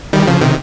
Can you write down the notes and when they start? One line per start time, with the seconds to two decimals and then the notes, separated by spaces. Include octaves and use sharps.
0.13 D#3 G3
0.27 C#3 F3
0.42 C3 D#3